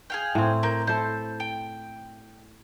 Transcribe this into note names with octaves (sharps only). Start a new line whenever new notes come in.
G#4 F5 G5
A2 C4
A#3 G6
E4 A4 C5
G5